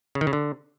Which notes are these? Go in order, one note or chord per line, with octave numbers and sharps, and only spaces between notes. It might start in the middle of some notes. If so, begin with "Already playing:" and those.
C#3
D#3
C#3
D3